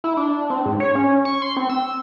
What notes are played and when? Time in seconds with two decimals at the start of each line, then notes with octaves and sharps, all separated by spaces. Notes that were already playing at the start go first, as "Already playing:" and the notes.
0.04 E4
0.17 D4
0.50 C4
0.66 G#2
0.80 C#5
0.95 C#4
1.25 C#6
1.42 C6
1.57 C4
1.69 E6